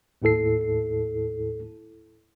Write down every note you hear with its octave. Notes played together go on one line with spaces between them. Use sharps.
D#2 A2 E4 A4 C7